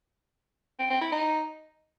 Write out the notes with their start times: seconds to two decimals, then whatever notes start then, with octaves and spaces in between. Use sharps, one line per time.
0.79 C4
0.90 C4
1.01 E4
1.12 D#4